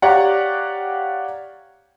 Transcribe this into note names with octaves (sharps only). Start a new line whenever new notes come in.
G4 C#5 D5 F5 F#5 A#5